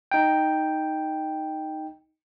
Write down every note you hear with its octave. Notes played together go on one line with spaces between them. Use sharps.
D#4 G5